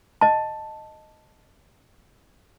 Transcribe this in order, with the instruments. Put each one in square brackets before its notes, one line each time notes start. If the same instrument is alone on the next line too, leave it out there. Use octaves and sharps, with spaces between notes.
[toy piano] D#5 A5